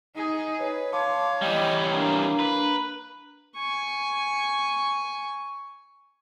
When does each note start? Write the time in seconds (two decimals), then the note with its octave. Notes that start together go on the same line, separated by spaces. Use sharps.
0.15 D#4 G#4
0.59 B4 C#5
0.93 C#5 F5 A5 C6 D6
1.42 E3 G3 D#5 G5
1.91 A#3 D4 A#5
2.39 B4
3.56 G#5 C#6